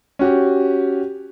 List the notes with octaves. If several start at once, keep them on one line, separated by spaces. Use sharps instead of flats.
C#4 F#4 G4